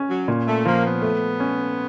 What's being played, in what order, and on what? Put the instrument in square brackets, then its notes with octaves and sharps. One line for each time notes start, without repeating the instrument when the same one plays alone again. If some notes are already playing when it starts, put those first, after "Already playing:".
Already playing: [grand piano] C#4
[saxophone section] F#3
[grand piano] A#2
[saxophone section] A3
[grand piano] F3 [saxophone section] A#3
[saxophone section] B3
[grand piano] A3
C#4